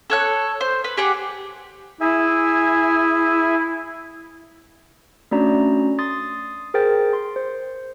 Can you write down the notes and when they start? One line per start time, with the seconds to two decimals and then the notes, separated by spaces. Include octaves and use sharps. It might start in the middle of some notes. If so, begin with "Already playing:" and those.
0.10 A4 C#5 F#6
0.61 C5
0.84 B4
0.97 G4 G#4 F#5 G5
2.01 E4 G#4 E5 G#5
5.31 A3 C#4 D4 F#4 D5 A#5
5.99 C6 D#6 A6
6.74 G#4 A#4 C5 G5 A6
7.13 C6
7.36 C5